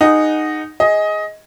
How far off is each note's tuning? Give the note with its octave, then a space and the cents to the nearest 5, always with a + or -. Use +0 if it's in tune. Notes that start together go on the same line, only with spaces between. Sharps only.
D#4 -10 G#4 +0 F#5 +0
G#4 +0 D#5 +15